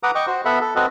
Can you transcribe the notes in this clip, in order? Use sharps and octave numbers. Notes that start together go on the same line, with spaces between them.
B4 F#5 A#5 D6 D#6
D#5 G5 C#6 D6
F#4 C5
B3 A4 E5 F#5 B5
A4
C4 F#4 A4 B4 D#5